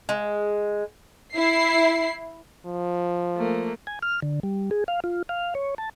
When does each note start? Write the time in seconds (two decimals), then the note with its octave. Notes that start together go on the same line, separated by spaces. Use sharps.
0.09 G#3
1.34 E4 C7
2.65 F3
3.36 A3 A#3
3.87 G#5
4.02 F6
4.22 D3
4.43 G3
4.71 G#4
4.88 F5
5.04 F4
5.29 F5
5.55 C#5
5.78 A5